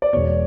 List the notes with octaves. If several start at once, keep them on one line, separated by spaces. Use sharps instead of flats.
D5
E1 E2 B2 C#5